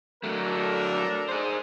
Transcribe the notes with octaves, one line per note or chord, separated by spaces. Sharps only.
F#3 A3 D4 A4 A#4
G#4 C5